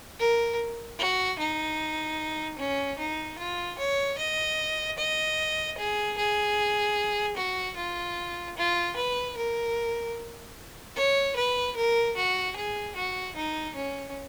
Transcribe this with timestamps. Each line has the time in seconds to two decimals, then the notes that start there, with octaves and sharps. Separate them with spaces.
0.19 A#4
0.99 F#4
1.39 D#4
2.58 C#4
2.98 D#4
3.39 F4
3.78 C#5
4.18 D#5
4.98 D#5
5.78 G#4
6.18 G#4
7.37 F#4
7.77 F4
8.57 F4
8.96 B4
9.37 A#4
10.96 C#5
11.36 B4
11.76 A#4
12.16 F#4
12.56 G#4
12.96 F#4
13.36 D#4
13.75 C#4